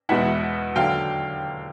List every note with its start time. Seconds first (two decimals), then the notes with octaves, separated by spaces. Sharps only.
0.09 E2 B2 G#3 B3 E4 E5 F#5
0.76 D#2 D3 F#3 F5 G5